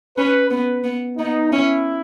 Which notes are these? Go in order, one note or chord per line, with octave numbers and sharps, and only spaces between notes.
C#4 B4
B3 B4
B3
B3 D#4
C#4 E4